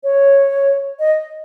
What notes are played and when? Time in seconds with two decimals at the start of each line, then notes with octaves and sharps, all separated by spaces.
0.03 C#5
0.99 D#5